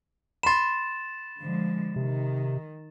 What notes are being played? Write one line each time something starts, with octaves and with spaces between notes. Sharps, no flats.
B5 C6 A6 E7
D3 F3 G#3
C3 D#3